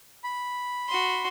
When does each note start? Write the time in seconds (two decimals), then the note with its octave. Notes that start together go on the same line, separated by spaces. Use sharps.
0.24 B5
0.89 F#4 C6